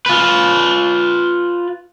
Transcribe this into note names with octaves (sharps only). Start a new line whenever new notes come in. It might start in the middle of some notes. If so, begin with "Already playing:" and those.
F4 B4